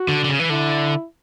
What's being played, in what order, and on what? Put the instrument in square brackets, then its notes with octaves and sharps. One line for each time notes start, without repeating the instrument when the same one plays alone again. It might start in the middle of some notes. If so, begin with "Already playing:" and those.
Already playing: [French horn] F#4
[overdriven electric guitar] D3
D3
C#3
E3
[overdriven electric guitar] D3 [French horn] E4